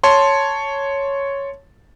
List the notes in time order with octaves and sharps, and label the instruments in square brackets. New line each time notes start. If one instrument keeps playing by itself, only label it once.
[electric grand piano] C#5 A5 C6